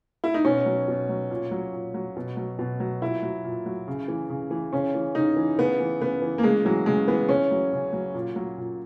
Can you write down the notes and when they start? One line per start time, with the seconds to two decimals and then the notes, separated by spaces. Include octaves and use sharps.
0.24 E4
0.34 D#4
0.44 B2 C#4
0.66 F#3
0.88 B2
1.09 F#3
1.30 A#2
1.51 F#3
1.73 A#2
1.94 F#3
2.16 B2
2.37 F#3
2.59 B2
2.80 F#3
3.02 A#2 E4
3.23 F#3
3.44 A#2
3.66 F#3
3.88 C#3
4.08 E3
4.30 C#3
4.51 E3
4.73 C#3 C#4
4.95 E3
5.15 C#3 D#4
5.36 E3
5.58 C#3 B3
5.80 E3
6.00 C#3 B3
6.22 E3
6.38 A#3
6.43 C#3 G#3
6.65 E3 F#3
6.86 C#3 G#3
7.08 E3 B3
7.29 C#3 C#4
7.51 F#3
7.73 C#3
7.93 F#3
8.14 A#2
8.36 F#3
8.58 A#2